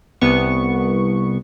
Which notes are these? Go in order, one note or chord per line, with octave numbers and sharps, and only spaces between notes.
C2 B3 C#6